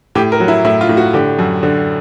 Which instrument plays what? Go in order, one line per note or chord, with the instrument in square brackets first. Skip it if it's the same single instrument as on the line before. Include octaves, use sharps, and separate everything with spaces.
[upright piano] A2 G4
A#4
F#3
E4
A2 E4
F4
A2
F#4
D3 G4
F#2
D3